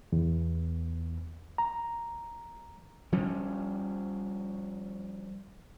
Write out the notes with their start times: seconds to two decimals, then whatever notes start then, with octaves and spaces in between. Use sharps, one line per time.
0.12 E2
1.58 A#5
3.12 F3 G3 C#4